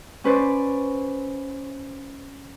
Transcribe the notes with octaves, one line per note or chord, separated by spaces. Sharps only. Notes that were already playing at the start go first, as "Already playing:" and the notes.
C#4 B4 C5 D5